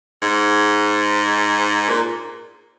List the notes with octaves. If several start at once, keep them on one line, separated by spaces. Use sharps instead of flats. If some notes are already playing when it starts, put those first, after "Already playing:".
G#2
A#2